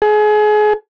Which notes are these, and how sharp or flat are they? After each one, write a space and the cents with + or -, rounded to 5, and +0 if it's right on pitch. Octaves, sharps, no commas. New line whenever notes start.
G#4 +30